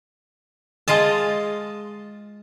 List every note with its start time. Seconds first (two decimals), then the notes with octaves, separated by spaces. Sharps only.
0.88 G#3 F4 D#5 A5